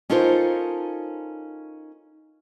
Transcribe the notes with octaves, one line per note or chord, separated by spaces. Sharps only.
C#4 D#4 F4 A4 A#4 C5